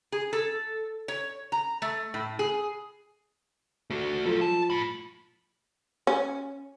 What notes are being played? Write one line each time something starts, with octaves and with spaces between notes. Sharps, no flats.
G#4
A4
C#5
A#5
A3
A2
G#4
A3 F#4
F3 F#3 A4
A5
A2 B5
C#4